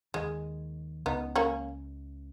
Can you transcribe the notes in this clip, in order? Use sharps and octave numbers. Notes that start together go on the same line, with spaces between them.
D#2 D#3 G#3
C#2 C#3 B3 D#4
A#3 C#4